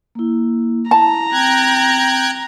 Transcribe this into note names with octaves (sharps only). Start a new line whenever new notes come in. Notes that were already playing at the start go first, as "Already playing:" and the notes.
A#3 E4
E4 A5 A#5
C4 G5 F#6 G#6